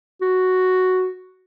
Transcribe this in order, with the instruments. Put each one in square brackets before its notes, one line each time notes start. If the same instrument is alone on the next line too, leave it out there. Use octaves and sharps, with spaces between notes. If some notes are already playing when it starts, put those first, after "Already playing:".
[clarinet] F#4